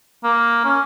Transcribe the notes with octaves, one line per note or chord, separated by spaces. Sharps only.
A#3
C#4